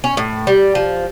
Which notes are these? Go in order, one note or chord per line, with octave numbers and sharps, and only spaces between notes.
C#4
A2
G3
F3